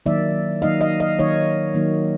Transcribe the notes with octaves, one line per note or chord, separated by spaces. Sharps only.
D#3 F#3 A#3 D#4 D5 E5
D#3 F#3 A#3 D#4 D#5 F5
D#5 F5
D#5 F5
D#3 F#3 A#3 D#4 C#5 D#5
D#3 F#3 A#3 D#4